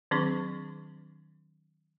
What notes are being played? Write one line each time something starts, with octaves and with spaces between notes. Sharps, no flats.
D#3 F#3 C4 D4 G#4 C#6